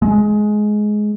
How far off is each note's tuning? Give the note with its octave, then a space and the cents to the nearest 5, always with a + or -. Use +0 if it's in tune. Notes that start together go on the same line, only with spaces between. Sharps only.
G#3 +15